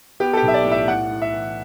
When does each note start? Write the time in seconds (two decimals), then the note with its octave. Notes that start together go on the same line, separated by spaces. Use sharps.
0.20 B3 G4
0.33 A4
0.37 G4
0.42 B1
0.48 E5
0.54 D5
0.65 A2
0.72 E5
0.87 A2 F#5
1.10 A2
1.22 E5
1.33 E3